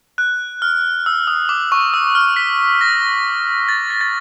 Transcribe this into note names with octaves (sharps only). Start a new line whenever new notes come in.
F#6
F6
E6
D#6
D6
C#6
E6
F6
B6
A#6
A6
A#6
A6